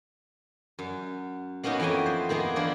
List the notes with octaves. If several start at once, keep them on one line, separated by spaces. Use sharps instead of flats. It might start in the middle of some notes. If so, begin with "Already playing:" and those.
F#2
A#3 B3 C#4 D#4 F#4
F2 E3 D#5 G5 G#5
C5
D#3 A#3 B3 G#4
E3 F3 A#3 D4 E4 F4